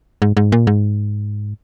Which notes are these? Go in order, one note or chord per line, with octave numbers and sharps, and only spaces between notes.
G#2
G#2
A#2
G#2